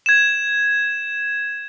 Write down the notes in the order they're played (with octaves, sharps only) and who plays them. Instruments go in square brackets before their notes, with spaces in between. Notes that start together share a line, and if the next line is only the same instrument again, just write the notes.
[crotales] G#6 E7